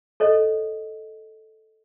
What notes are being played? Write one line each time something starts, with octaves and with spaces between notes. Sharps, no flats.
A4 C#5 D#5